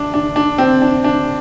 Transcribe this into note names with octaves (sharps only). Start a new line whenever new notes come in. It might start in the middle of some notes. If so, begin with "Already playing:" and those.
Already playing: D4
D4
D4
C4
D4
D4